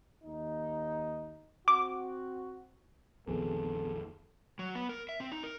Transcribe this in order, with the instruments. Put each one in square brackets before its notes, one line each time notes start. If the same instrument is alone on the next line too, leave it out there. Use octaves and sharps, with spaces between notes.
[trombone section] D#2 D#4
[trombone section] C4 F#4 [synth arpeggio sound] D6
[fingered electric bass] A#1 F2 D#3 [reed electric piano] B3 C4 G#4 [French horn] A4
[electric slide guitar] F#3
B3
A#4
E5
C4
D#4
A#4